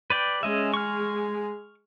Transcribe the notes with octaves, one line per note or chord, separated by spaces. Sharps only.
B4 D5 G5
G#3 C#4 G#4 D#5 E5
C#6 F6